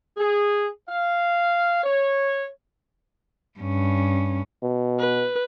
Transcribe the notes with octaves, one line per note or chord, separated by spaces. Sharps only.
G#4
F5
C#5
G2 C#4
B2
B4